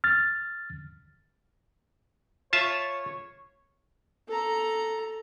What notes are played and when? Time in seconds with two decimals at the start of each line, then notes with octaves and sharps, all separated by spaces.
0.04 F6 A6
2.53 F4 C#5 E5 A5
4.28 A4 A#5